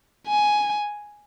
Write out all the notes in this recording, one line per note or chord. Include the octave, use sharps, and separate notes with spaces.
G#5